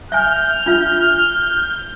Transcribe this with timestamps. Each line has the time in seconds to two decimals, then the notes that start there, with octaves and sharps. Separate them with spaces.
0.12 E5 G#5 F6 G6
0.66 D4 F4 E5